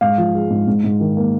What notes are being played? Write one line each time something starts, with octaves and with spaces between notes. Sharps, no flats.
G#2 F5
F3
G#3
G#2
G#2
G#2
D#3
A#3